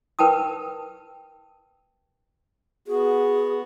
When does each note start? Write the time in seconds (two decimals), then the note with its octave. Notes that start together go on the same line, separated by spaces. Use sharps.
0.19 A#4 B4 G5 A5 D#6
2.87 B3 F#4 G#4